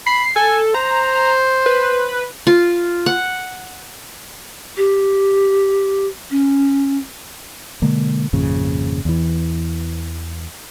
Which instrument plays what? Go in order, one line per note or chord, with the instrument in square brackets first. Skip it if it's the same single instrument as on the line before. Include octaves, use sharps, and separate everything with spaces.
[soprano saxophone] B5 [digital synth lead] C7
[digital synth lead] A4 [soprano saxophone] G#5
[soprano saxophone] C5 [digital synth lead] A#5
[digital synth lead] B4
[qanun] F4
F#5
[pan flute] G4
C#4
[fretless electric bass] B2 D3 G#3 A#3
G#1 F2 A#2 C#3
E2 E3